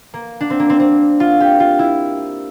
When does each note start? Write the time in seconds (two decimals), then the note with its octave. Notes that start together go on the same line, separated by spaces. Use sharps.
0.14 A#3
0.41 D4
0.50 C4
0.59 A#3
0.70 C4
0.80 C4
1.20 F4
1.40 G4
1.60 F4
1.79 E4